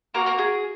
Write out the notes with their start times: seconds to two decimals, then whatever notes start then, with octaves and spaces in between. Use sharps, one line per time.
0.14 A#3 F#4 A#4
0.26 A#3 A#4
0.38 G#4